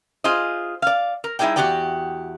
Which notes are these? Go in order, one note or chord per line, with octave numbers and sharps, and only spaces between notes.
F4 G#4 C5 D#5
D5 F5
A#4
G3 D#4 E4 G#4 D5 G5
E2 A3 F#4 G4 D5 G5